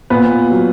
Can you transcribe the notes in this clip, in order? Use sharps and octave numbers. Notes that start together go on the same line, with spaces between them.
A#2 B3 B4
F#3